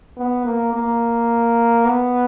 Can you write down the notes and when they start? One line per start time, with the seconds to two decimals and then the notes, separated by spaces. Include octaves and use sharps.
0.17 B3
0.45 A#3
0.73 A#3
1.86 B3